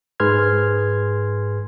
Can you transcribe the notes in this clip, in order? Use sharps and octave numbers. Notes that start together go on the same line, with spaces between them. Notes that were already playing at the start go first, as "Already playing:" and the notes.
G#2 G#4 B4 C6 F6 G#6